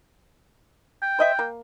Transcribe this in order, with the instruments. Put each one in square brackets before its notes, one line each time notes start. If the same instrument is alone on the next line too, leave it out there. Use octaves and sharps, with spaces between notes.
[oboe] G5
[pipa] C5 D#5 E5
A#3